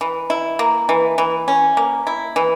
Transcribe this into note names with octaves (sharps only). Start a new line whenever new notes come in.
E3
E4
A#3
E3
E3
C#4
A#3
E4
E3